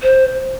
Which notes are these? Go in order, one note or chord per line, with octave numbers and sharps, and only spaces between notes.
C5